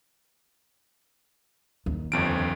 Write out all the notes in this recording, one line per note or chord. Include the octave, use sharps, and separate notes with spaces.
D#2
G1 F2 D7